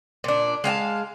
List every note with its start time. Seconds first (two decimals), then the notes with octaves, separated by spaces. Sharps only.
0.24 A#2 D4
0.64 G#3 F5 G5 A5